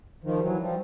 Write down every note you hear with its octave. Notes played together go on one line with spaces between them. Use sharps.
D#3 F3
G3
E3 F#3
F3 G3